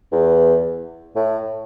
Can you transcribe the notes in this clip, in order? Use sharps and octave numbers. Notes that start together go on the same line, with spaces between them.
E2
A2